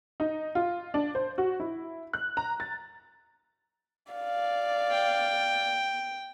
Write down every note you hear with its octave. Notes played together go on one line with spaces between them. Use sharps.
D#4
F4
D4
C5
F#4
E4
F#6
A#5
A6
D5 F5
G5